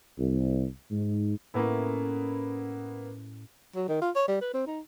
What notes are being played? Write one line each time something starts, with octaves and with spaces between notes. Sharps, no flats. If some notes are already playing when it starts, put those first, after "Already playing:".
C2
G#2
A2 A#3 B3 C#4 E4
F#3
D#3
F4
C#5
G3
B4
C4
D#4